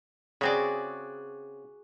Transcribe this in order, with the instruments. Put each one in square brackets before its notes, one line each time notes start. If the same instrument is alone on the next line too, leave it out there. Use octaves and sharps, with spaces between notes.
[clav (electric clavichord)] C#3 C4 [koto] F#4 G#4 D5